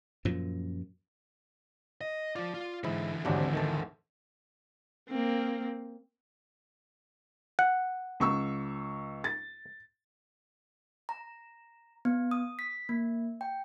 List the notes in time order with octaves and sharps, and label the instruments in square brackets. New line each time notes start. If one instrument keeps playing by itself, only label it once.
[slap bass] F#2 A#2 F3
[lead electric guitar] D#5
[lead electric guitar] F3 F4 [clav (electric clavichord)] D5
[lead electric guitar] F4
[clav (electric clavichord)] G#2 E4 [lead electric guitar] D3 E3
[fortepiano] G#1 D2 [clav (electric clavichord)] C3 F#3 D4
[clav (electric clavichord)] D#3 A3 A5
[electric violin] A#3 C4
[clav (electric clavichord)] F#5
[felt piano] C#2 C#6 E6
A6
[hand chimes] A#5
B3
D#6
B6
A#3
G5